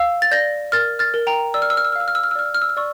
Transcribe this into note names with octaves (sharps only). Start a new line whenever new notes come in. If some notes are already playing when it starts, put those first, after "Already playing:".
Already playing: F5 E6
A6
D5 G6 A#6
A#4 F6 A6
F6 A6
A#4
G5 A#5
D5 E6
F6
E6
F6
E6
F6
F5 E6
F6
E6
F6
E6
D5 F6
E6
F6
E6
F6
D5 C#6 E6